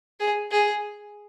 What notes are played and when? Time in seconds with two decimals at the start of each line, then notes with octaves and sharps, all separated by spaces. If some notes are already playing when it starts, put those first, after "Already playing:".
0.20 G#4
0.51 G#4